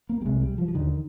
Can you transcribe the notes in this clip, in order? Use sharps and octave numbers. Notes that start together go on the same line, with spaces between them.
A#3
G3
C2 C3 G#3
G3
F3
F3
D#2 D3 D#3